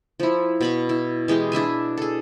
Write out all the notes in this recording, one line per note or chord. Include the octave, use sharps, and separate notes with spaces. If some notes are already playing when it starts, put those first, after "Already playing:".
F3 E4
B2 B5 C#6
E4
E3 G#3 G4 G#4
D4 E4 E5 G#5
G#4 A4